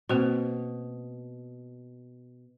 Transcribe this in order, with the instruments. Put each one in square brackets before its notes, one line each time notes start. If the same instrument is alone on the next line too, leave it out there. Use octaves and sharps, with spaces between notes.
[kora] B2 [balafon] A#3 C4 C5